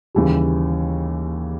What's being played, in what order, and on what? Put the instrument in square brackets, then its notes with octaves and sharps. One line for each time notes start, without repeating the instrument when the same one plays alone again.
[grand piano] D#2 C#3 E3 G3